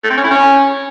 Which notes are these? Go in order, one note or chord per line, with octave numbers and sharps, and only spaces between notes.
A3
C4
C#4
E4
C#4